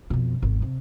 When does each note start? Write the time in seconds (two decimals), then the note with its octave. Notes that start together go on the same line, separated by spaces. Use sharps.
0.10 F2 B2
0.42 G#1 E2
0.62 C3